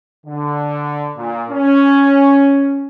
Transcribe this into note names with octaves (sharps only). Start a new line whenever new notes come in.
D3
A#2
C#4